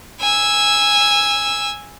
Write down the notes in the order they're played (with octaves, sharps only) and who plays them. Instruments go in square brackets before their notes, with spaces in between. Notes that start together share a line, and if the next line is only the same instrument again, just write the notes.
[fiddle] G#5 E6